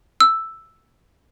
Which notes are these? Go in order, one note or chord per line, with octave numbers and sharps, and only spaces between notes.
E6